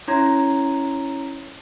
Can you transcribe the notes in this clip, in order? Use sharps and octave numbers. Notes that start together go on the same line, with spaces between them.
C#4 E4 C#5 A#5 C6 G#6